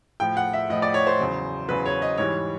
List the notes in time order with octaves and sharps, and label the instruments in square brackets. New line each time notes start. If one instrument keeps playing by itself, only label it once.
[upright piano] A2 F3 G5
F#5
E5
A2 F3 D#5
D5
C#5
C5
E2 C#3 F#3
E2 C#3 F#3 B4
C#5
D#5
G#2 E3 G3 C#5